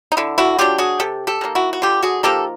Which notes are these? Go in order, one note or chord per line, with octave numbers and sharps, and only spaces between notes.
D#4
D3 E4
E4 F#4
F#3 A#3 D4 F4 G4
F#4 G#4
C3 G4 A4
G4 A4
D#3 G3 A#3
E4 F#4
F#4
D3 F4 G4
F#4 G#4
F3 A#3 D#4 G4 A4